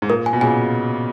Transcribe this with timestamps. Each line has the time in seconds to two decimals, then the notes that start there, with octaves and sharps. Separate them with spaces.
0.02 G#2
0.09 A#2 A#4
0.26 G#5
0.33 B2
0.41 A#2 C#3 G#5